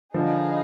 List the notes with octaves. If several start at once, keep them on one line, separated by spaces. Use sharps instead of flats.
D3 F3 D#4 G#4 B4 F5